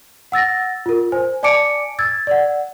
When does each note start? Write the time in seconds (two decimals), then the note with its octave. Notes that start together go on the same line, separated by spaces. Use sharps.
0.32 F#5 E6 A6 A#6
0.86 F4 A#4
1.12 C5 G#5
1.43 D5 G#5 A5 D6 C#7 D7
1.99 E6 G#6 A6
2.27 D5 F#5